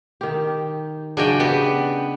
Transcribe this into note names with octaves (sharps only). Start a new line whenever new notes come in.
D#3 G4
C#3 F#3 D4 D5 D#5 G5
B3 G4